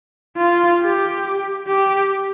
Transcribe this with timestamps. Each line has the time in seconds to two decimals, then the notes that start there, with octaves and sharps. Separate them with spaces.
0.37 F4
0.80 G4
1.67 G4